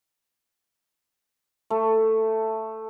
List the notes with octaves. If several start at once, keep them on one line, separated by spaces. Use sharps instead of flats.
A3